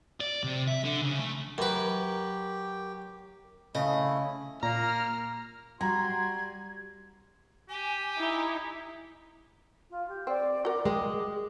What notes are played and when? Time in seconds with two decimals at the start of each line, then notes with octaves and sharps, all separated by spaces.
0.21 D5
0.44 C3
0.67 E5
0.84 D3
1.01 C#3
1.19 A3
1.58 F#2 G4 A#4 B4
3.75 C#3 A3 E4 D#5
4.63 A#2 A#3 A#5 F6
5.81 G3 F#4 A#5 C6 G#6
7.69 G4 G#5
8.18 D#4 E4
9.90 F4
10.08 G4
10.27 C4 D5
10.65 F#4 A#4 D6
10.85 G#3 A#4 G5